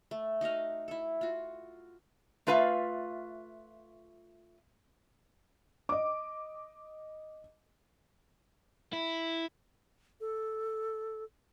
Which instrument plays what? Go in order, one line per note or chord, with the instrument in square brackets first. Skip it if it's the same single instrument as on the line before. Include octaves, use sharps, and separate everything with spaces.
[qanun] A3
D#4 F#4 D#5 F5
E4 A4
F4 F#4
[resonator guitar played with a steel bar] A3 F4 B4 E5 F5
[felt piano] D#5 D6
[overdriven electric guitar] E4
[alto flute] A4